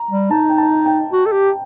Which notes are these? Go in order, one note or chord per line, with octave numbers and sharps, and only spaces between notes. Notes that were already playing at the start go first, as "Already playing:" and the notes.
Already playing: A#5
G3
D#4 A5
G5
A5
G5
F#4
A4
G4